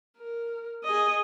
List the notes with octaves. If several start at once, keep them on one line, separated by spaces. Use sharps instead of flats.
A#4
G#4 D#5